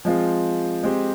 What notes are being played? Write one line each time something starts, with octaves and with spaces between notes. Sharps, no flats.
F3 G#3 C4 F4
G#3 C4 G4